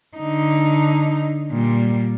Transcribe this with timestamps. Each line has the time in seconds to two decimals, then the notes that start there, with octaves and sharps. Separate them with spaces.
0.17 D3 D#4
1.52 A#2 G3